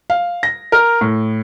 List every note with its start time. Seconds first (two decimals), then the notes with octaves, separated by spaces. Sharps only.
0.10 F5
0.43 A#6
0.72 A#4
1.01 A2